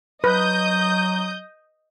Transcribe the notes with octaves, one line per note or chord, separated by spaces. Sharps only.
F#3 B4 D#5 D#6 G6